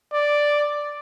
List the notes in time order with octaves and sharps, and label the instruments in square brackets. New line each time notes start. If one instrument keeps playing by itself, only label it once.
[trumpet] D5